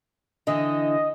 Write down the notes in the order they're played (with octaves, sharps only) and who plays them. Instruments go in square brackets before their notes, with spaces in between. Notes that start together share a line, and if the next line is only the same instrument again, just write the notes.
[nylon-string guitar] D3 E3 [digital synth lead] D#5